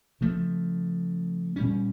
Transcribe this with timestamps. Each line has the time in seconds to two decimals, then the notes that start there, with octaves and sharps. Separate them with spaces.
0.21 C#3 F3 A3
1.56 A#2 G3 C#4